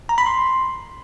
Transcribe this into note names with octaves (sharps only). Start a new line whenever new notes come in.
A#5
B5
C6